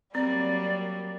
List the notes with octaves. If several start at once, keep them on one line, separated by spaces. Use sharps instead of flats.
F#3 G3 A#3 C4 D5